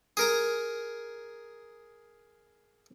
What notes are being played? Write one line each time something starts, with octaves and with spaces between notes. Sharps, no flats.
G#4 A#4 A#5